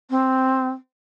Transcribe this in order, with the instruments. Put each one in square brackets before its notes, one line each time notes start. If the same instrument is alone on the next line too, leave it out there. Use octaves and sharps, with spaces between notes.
[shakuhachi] C4